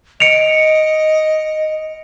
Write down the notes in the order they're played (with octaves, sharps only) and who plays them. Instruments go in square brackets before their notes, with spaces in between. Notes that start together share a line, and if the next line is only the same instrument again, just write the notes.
[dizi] D#5 [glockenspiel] C#7 D7 F7